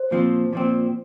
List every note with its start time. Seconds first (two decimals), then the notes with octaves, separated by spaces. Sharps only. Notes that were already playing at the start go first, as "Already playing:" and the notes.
Already playing: C5
0.11 A#2 F3 C4
0.53 A#2 F3 C4